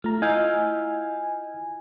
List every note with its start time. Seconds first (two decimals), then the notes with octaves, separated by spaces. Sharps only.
0.04 A3 F4 A#5
0.22 E4 F4 D#5 F5 G#5 F6 G6